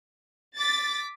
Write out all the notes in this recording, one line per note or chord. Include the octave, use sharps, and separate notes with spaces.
D6 A6 B6